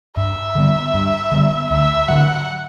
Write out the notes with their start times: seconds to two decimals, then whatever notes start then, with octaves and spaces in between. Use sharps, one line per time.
0.17 G2 E5
0.55 D3 G3 B3
0.94 G2
1.32 D3 G3 B3
1.71 D2 E5
2.08 D3 F#3 F#5